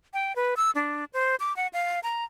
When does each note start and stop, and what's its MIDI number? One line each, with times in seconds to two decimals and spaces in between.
0.14 0.35 79
0.36 0.55 71
0.57 0.71 88
0.75 1.05 62
1.13 1.36 72
1.40 1.55 86
1.56 1.67 78
1.73 2.00 77
2.03 2.25 82